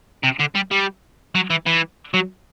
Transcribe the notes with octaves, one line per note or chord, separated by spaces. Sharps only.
C3
D3
G3
G3
F#3
E3
E3
F#3